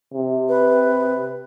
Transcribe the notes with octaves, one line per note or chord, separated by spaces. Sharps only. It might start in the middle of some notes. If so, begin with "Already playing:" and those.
C3
B4